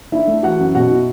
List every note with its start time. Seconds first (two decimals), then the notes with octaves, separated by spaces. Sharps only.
0.12 D4 E4 E5
0.27 A3
0.43 E3 F#4 F#5
0.59 F#2
0.74 B2 F#4 F#5
0.90 E4